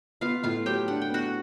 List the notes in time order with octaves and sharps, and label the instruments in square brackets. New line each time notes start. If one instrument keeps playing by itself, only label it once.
[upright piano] B3 [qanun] F4 F5
[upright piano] A2 [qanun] F4 F5
[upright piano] F#3 [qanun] G4 G5
[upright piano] D4 [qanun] F#5
[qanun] G5
[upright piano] B3 [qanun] F#4 F#5